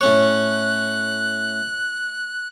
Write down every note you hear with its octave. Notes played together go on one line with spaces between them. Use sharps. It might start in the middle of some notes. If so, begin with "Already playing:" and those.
A2 C#4 C#5 F#6